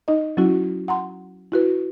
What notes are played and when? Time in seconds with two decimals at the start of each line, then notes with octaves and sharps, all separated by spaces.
0.08 D#4 D#5
0.37 F#3 C#4 E4 F#4
0.88 F#5 A#5 C6
1.52 E4 F#4 B4